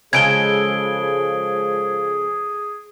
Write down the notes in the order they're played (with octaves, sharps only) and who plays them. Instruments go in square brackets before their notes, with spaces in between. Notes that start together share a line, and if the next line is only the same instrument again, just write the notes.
[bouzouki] C#3 G#3 A4 [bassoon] F3 [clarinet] G#4 [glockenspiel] G#6 D7 G7